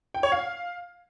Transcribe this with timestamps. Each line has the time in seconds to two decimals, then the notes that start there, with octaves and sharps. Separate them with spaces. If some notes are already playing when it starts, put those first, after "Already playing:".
0.14 G5
0.23 C#5
0.32 F5